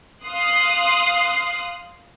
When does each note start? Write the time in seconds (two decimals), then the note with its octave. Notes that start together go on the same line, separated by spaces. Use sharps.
0.25 F5 C6 D#6 F#6